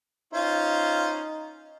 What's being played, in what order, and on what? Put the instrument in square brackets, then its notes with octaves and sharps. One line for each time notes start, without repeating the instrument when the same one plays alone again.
[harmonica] C#4 F4 C5 [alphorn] D#4